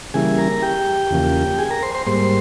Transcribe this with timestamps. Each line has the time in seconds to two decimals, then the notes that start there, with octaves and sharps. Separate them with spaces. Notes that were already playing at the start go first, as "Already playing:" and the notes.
0.14 C#3 E3 G3 A#3 E4 G#4 G#5
0.38 A#4 A#5
0.62 G4 G5
1.10 E2 C#3 F3 A#3
1.59 G#4 G#5
1.71 A#4 A#5
1.83 C5 C6
1.95 C5 C6
2.06 G#2 G3 A#3 C5 C6